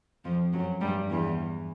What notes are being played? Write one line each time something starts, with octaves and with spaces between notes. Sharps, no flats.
F2 F3
F#2 F#3
G2 G3
E2 E3